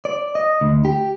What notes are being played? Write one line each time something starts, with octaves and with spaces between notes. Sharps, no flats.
D5
D#5
D2
G4